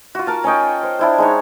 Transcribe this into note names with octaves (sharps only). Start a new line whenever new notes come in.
F4 F#4
A#4 F5 A5
C#4 C#5 D#5 G5
C5
D4 E4 C5
G#3 D#4 C#5